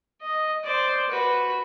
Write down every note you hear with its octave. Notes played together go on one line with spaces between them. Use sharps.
D#5
C5 D5
F#4 B4